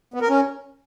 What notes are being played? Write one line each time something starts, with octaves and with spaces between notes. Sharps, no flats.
B3
A#4
C#4